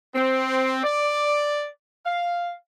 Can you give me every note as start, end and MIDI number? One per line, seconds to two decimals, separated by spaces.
0.14 0.82 60
0.84 1.67 74
2.05 2.52 77